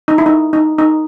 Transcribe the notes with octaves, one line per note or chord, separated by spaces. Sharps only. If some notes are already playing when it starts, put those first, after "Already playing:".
D#4
E4
D#4
D#4
D#4